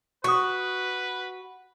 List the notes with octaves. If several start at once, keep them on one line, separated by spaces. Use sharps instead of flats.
F#4 B4 C#6 D#6